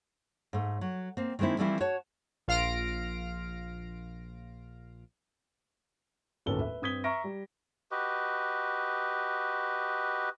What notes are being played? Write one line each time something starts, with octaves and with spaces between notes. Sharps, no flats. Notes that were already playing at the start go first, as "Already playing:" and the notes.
G#2 A3
F#3
A#3 C4
D#3 G#3 A#3 C4 E4
E3 F3 G3 A3 C4 E4
F#4 C#5 A5
A#1 F4 F5 F6 A#6 D7
D1 G1 D#2 C#4 A4 G7
B4 E5
G2 C4 D#6 G#6 B6 G7
E5 A#5 C#6 F6 A#6 D7
G3
F#4 G4 B4 D#5